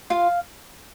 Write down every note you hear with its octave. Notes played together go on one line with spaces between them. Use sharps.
F4 F5